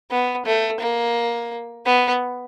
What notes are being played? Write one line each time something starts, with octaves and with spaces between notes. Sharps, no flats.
B3
A3
A#3
B3